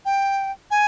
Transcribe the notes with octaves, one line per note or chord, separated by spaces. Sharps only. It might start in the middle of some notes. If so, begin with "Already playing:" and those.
G5
G#5